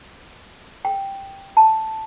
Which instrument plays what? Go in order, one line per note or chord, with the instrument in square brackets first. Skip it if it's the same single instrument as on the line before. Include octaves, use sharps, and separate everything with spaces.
[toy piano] G5
A5